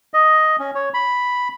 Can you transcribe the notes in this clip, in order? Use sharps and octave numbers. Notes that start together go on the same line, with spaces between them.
D#5
C#4
C#5
B5